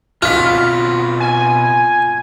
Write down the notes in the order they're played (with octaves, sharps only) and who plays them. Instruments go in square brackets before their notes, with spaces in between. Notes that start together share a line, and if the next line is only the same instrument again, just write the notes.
[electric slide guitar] B2 C4 F#4 [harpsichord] F4 [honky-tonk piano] F6 B6
[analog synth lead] G#5